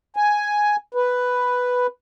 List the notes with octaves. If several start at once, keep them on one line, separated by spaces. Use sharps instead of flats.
G#5
B4